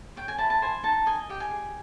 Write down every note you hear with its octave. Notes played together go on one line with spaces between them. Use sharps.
C#5 G5
G#5
E4 A5
A5
C5 G#5
D#4 A5
D#5 G#5
G4 G5
G#5
G#4